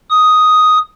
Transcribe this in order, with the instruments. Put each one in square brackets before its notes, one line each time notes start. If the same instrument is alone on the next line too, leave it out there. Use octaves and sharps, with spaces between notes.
[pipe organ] D#6